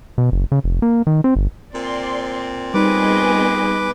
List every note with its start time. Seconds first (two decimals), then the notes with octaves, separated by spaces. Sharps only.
0.18 B2
0.32 F#1
0.52 C#3
0.64 F1
0.82 A#3
1.07 D#3
1.24 C4
1.36 G1
1.73 A#2 C4 D5 C6
2.74 G3 B3 D#4 G#4 B4 D#5 D6